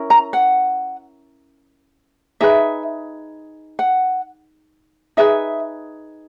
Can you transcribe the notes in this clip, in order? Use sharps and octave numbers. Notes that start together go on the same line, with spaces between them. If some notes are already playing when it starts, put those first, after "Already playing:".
Already playing: C#4 E4 A#4
A#5
F#5
D#4 G#4 B4 E5
F#5
D#4 G#4 B4 E5